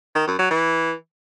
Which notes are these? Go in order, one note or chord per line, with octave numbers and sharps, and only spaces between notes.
D#3
F#2
F#3
E3